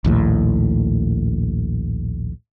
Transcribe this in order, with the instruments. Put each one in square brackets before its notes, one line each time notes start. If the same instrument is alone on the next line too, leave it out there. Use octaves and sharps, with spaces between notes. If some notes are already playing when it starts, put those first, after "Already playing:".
[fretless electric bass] A#1 D#2 A2